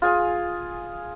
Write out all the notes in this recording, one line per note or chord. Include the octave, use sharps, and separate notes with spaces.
F4 G#4 G#5